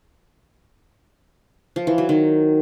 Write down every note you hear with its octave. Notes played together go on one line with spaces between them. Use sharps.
F3
E3
F#3
D#3